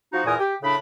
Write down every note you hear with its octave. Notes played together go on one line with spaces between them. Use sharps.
F3 D#4 F#4
E2 A#2 A#4 G#5 D#6
G4
A2 C#3 D4 B5